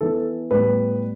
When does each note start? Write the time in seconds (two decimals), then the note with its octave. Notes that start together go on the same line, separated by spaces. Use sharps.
0.01 E3 B3 A4
0.51 A2 G3 B3 B4